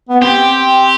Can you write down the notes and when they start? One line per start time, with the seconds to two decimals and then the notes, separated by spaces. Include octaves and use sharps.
0.09 B3
0.21 C4 G4